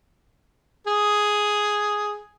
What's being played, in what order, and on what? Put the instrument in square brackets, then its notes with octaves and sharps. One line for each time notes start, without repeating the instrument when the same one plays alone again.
[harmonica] G#4